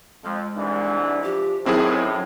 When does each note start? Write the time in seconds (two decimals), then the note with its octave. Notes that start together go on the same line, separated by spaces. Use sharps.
0.24 F2 F3 G#3
0.57 C2 G#2 E3 D4
1.24 F3 G4
1.66 F#2 A2 D#3 F#3 C4 E4 G#4